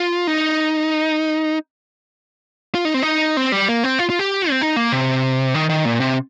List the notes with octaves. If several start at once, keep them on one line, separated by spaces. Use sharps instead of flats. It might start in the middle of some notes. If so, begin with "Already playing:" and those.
Already playing: F4
D#4
F4
D#4
C4
D#4
C4
G3
A#3
C4
F4
F4
G4
C4
D#4
A#3
C3
D#3
D#3
A#2
C3